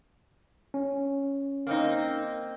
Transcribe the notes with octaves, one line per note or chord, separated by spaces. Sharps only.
C#4
A#3 C4 D#4